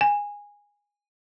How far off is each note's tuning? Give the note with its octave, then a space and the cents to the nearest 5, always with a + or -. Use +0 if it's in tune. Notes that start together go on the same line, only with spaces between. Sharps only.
G#5 -15